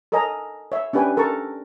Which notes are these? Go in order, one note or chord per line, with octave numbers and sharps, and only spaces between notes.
A4 A#4 C#5 D#5 G#5 A#5
C#5 E5
C#4 D4 G4 B4 G5 G#5
A4 A#4 A5 C#6